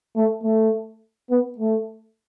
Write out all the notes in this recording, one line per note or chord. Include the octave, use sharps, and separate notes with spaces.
A3
A3
B3
A3